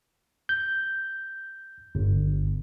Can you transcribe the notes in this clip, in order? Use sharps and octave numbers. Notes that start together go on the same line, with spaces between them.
G6
G1